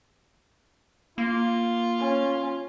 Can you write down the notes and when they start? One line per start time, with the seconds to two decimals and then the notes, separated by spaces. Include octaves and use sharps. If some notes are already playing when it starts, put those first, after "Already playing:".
1.18 A#3 F4
1.98 C#4